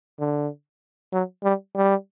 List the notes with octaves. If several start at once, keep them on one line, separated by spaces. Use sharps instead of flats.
D3
F#3
G3
G3